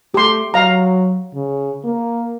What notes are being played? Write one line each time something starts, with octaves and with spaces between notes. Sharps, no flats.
A3 G4 C6
F#3 F5 A#5
C#3
A#3